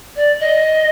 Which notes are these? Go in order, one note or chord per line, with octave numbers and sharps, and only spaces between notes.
D5
D#5